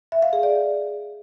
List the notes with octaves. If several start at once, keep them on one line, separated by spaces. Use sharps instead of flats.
E5
F5
G#4
D5